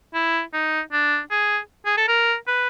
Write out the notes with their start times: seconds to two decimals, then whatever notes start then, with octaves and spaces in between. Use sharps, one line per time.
0.14 E4
0.53 D#4
0.92 D4
1.31 G#4
1.86 G#4
1.97 A4
2.08 A#4
2.47 B4